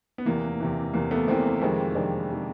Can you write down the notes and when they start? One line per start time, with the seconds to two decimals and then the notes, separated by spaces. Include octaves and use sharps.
0.18 B3
0.26 E2 C3 E3 A#3
0.60 E2 C3 E3
0.93 E2 C3 E3 A#3
1.11 A3 B3
1.27 E2 C3 E3 A#3 C4
1.61 F2 C3 D#3 G#3 A#3 C4
1.95 F2 C3 D#3 G#3 C4 D4
2.30 C3 D#3 G#3